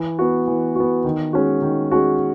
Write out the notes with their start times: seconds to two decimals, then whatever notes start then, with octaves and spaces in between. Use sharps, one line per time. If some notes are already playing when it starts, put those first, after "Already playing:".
Already playing: E3
0.19 B3 F#4
0.47 E3
0.75 B3 F#4
1.04 D#3
1.33 G#3 C#4 F#4
1.62 D#3
1.91 G#3 C#4 F#4